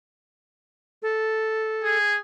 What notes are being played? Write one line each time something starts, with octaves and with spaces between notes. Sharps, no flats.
A4
G#4